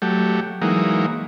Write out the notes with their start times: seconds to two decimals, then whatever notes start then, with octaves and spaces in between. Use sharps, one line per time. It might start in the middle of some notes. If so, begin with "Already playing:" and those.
0.02 F#3 A3 G4
0.62 E3 F#3 G#3 A#3 D#4